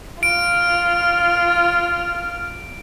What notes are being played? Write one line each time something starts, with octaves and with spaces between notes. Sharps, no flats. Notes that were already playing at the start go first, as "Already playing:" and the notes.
F4 F6 D7